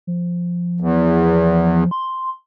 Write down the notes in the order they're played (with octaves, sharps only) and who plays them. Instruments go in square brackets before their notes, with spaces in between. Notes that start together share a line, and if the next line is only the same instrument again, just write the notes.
[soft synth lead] F3
[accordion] E2
[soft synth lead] C6